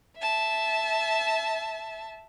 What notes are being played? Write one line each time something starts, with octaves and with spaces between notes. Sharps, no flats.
E5 A5